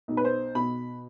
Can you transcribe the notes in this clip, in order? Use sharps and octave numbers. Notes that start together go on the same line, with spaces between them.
B1
B4
C5
B2 B5